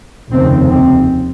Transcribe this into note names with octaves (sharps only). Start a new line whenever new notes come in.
F1 D#2 C#3 C4
C4